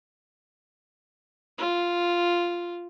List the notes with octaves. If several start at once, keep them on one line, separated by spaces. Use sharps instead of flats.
F4